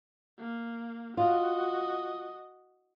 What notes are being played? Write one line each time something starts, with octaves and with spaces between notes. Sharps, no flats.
A#3
F4 F#4 D#5